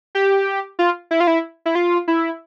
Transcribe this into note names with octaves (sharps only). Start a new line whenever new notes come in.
G4
F4
E4
F4
E4
E4
F4
E4